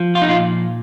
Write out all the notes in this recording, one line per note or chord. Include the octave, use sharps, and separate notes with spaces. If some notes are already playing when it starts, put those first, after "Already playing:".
Already playing: F3
F4
D#4
A#2 F4